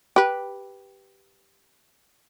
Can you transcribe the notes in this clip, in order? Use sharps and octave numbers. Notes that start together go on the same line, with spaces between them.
G4 B4